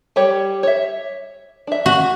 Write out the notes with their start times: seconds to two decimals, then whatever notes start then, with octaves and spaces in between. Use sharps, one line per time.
0.16 G3 G4 C#5
0.63 C#5 E5
1.67 D4 E5
1.86 F#4